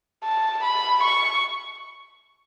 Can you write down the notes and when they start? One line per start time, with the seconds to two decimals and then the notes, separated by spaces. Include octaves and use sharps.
0.24 A5
0.64 B5
1.03 C#6